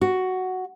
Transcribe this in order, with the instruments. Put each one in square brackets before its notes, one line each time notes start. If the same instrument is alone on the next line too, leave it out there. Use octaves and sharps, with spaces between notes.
[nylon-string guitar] F#4